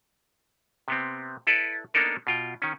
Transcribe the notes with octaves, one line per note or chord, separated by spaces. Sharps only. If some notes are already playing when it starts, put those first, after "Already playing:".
C3 B3 C4
E4 A4 B4 D5
A#3 B3 D4 D#4 A4 A#4
B2 F4 G5
D#3 C#4